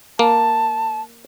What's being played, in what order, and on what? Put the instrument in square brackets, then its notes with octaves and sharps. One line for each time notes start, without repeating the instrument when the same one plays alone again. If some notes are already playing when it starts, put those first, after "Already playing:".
[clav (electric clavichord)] A#3 [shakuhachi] A5